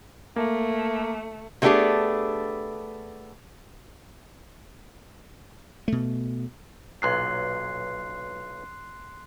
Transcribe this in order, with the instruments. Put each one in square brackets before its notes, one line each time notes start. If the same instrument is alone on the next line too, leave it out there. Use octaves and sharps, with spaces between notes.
[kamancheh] A3 [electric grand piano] A#3
[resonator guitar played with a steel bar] C3 A3 B3 D4 G4 G#4
[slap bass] B2 A3
[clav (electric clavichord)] B1 A#2 F#3 [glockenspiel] C6 F#6 C7